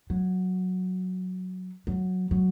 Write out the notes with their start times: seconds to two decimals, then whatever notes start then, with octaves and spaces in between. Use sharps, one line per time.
0.10 F#3
1.87 F#3
2.31 F#3